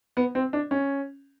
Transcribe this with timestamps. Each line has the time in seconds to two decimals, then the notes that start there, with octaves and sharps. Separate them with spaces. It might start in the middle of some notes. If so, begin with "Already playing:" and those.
0.17 B3
0.35 C4
0.53 D4
0.71 C#4